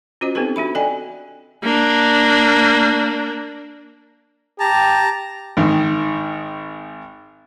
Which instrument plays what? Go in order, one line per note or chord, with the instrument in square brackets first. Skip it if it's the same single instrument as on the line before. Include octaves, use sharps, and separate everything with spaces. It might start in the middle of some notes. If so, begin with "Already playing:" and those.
[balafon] C#4 F4 F#4 C5 D#5
B3 C4 D#4 G4 A4 B4
D4 F#4 E5 B5
A4 D5 D#5 G5 G#5
[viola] A#3 D4
[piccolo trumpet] G4 [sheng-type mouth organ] A5 A#5
[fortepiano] G#1 D#3